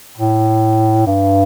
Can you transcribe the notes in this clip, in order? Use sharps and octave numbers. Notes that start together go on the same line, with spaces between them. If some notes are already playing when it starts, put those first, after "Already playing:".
A2
G2